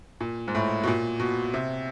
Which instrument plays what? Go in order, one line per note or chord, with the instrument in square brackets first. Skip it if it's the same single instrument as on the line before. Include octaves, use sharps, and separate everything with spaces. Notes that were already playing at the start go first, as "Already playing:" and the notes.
[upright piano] A#2
G#2
A2
B2
A#2
B2
C3